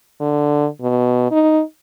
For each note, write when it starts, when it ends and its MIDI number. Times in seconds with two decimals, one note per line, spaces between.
0.21 0.67 50
0.82 1.29 47
1.31 1.62 63